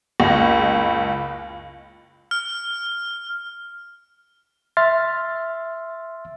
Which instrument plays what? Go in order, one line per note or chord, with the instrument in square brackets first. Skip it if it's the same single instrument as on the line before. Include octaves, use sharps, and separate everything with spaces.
[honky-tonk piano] F#1 C#2
[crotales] F6
[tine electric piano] E5 C6 F6 A6